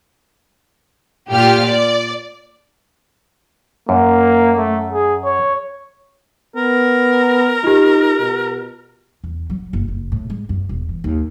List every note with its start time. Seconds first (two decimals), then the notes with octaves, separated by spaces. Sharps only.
1.32 A#2 F4 G4 F6
1.64 D5
3.89 F#2 A#3
4.57 A3
4.93 G#4
5.25 C#5
6.56 B3 A#4
7.63 D#4 F4 G4
8.20 B2
9.24 E2
9.50 F#3
9.73 F#1
9.88 F#1
10.12 A2
10.30 G#3
10.49 F#2
10.69 E1
10.89 E3
11.04 D#2